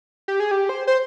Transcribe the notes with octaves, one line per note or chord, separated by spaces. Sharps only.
G4
G#4
G4
C5
C5